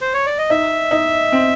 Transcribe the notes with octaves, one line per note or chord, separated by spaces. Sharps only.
C5
C#5
D5
D#5
D#4 E5
D#4
C4